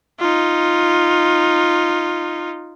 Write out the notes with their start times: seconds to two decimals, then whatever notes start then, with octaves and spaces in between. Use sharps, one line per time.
0.19 D#4 F4